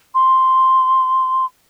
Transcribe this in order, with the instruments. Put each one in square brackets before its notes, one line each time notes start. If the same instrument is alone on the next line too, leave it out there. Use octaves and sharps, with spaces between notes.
[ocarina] C6